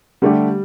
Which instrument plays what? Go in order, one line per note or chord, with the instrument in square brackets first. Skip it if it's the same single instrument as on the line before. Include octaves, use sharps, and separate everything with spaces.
[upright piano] D3 A3 D4 G4 [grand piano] G3